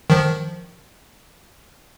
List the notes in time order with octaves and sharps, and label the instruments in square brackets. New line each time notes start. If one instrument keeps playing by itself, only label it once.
[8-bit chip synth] D#3 F3